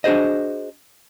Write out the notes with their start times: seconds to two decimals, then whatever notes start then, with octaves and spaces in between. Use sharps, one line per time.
0.04 D4 F#4 G#4 C5 D#5